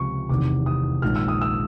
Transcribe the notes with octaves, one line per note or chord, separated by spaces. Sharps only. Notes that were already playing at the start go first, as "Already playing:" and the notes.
Already playing: C#2 C3 F3 C#6
F1 E2 C3 D#3 D6
D#6
A#1 G#2 D#3 F6
E6
D#6
E6